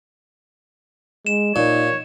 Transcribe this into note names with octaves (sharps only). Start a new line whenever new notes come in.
G#3 E7
A#2 D#4 C#5